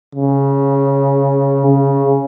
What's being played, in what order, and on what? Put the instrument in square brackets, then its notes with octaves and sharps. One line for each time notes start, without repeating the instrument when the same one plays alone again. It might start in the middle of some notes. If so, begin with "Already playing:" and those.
[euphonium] C#3
C#3